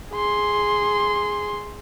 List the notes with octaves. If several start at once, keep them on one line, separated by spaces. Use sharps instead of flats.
G#4 C6